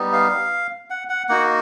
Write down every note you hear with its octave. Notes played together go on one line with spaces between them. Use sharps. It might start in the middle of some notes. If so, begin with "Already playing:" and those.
Already playing: G3 B3 D#4
F5
F#5
F#5
A#3 D#4 F#4 F#5